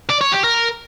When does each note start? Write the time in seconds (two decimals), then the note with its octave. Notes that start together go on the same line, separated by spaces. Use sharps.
0.10 D5
0.21 C#5
0.33 G4
0.44 A#4